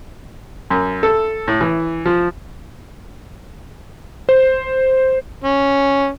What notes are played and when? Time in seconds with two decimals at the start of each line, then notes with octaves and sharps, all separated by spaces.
0.70 F#2
1.03 A4
1.48 A2
1.61 E3
2.06 F3
4.29 C5
5.44 C#4